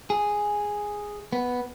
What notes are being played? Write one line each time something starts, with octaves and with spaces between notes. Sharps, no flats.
G#4
B3